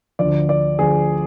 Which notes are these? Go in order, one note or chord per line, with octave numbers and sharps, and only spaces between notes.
D2 D3 F3 D5
D5
D2 D3 F3 G#4